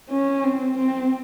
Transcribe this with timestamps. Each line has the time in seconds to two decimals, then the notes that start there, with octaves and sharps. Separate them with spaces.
0.10 C#4
0.44 C4
0.77 C4